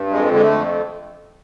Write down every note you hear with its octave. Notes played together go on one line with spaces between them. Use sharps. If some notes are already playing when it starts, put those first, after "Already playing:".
Already playing: G2
F2 G#3
D3 G#3
A3
F2